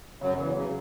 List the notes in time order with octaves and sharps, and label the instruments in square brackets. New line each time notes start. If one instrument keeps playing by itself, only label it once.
[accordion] F#2 F#3 [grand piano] C#3
[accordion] E2 E3 [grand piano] C#4
[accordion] C#3 [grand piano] F#3